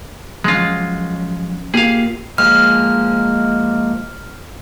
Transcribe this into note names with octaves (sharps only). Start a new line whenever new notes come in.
F3 F#3 G#3 C#4 F4
A#3 F4 G4 G#4 F5
F3 G#3 A#3 F6